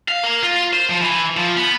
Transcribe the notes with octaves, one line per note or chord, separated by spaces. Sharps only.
F5
A#3
F4
C5
F3
E3
F3
B3